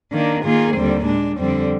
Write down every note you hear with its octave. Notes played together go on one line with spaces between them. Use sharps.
D#3 A#3 D4
D#3 A#3 F4 G#4
D#2 D3 G3 C4
A#2 G#3 D4
F2 D3 G3 C4